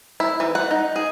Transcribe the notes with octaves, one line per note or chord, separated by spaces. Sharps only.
E4
E3
F#5
D#4
G#4